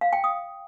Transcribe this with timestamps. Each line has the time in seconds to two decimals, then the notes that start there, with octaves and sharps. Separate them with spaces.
0.01 F5
0.13 G5
0.24 D#6